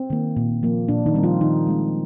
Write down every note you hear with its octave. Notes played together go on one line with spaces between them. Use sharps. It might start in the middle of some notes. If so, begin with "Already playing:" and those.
Already playing: C4
D#3 A#3
A#2
F3 A#3
A#2 D4
D#3 D#4
G3 C4
F3 F4
D#3 D#4
G#3 C4